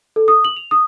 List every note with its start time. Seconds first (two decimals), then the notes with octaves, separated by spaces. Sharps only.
0.16 A4
0.28 D#6
0.45 F#7
0.57 F7
0.71 D#6